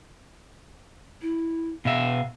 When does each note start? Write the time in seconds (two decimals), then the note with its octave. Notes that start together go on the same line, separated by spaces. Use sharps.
1.22 E4
1.85 B2 E5 F5